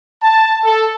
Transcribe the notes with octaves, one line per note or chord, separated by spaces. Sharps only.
A5
A4